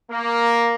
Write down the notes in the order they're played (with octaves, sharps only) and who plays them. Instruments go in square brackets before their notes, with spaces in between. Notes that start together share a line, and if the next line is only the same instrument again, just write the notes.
[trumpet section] A#3